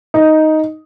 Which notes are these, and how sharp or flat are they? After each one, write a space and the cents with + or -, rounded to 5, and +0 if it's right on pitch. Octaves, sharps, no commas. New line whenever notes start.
D#4 +5